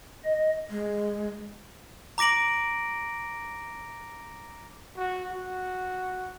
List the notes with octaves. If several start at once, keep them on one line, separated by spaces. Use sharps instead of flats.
D#5
G#3
A#5 D6 A#6 D7 F#7
F#4
F#4